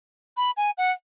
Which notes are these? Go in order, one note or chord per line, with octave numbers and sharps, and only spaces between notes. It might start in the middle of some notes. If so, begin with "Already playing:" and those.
B5
G#5
F#5